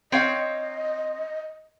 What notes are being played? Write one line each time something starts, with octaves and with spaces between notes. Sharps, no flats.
C4 C#5 D#5 F5